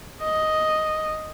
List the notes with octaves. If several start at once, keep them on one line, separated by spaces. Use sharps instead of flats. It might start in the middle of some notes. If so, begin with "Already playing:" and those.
D#5